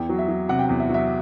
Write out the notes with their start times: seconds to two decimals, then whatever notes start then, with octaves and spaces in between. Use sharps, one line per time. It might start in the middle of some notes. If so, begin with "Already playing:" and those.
Already playing: E2 G5
0.09 F#3
0.18 E5
0.28 F#3
0.49 C3 F#5
0.59 G5
0.64 E2 F#5
0.80 E5
0.90 F#3 E5